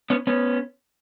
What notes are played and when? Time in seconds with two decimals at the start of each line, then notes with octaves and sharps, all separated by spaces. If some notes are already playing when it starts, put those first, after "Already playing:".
0.10 B3 C#4
0.27 B3 C#4